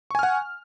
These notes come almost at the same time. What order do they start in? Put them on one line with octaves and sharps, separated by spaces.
C#6 G#5 F6 F#5